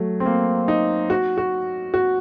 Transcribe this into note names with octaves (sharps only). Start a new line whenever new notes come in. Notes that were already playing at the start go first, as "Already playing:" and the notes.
Already playing: F#3 A3
C4
A#3
D#4
F#4
F#4
F#4